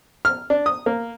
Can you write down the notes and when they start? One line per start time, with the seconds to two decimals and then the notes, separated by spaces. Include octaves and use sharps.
0.25 F6
0.50 D4
0.66 D#6
0.86 A#3